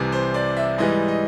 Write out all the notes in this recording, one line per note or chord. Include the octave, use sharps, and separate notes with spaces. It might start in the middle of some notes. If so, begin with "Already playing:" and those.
Already playing: C2 C3 E3
C5
D5
E5
G#2 E3 G3 D#5
D#5